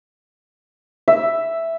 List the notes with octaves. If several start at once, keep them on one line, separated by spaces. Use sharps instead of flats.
E5